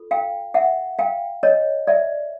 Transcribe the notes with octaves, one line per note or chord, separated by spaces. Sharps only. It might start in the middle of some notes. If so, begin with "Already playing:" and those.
Already playing: F4 A4
F5 G5
E5 F#5
F5 G5
C#5 D#5
D5 E5